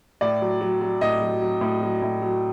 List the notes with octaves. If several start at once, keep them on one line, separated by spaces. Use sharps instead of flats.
A2 D5
F#3
F#3
F#3
A2 D#5
F#3
F#3
A2
F#3
A2
F#3